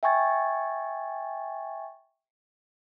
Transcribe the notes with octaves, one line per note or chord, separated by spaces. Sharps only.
E5 G5 G#5 C#6 G#6 A6